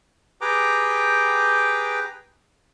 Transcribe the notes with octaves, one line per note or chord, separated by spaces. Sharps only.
G4 G#4 B4 G5 A#5 D6